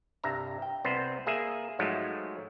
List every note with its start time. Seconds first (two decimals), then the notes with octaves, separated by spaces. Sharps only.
0.24 C2 G2 E5 A#5
0.62 G5
0.85 C2 B3 C4 B4 C5
1.27 A#3 G#4 E5
1.79 G#2 F3 F#3 G#3 A3